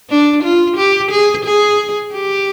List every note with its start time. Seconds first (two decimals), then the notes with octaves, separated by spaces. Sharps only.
0.10 D4
0.44 F4
0.77 G4
1.11 G#4
1.45 G#4
2.13 G4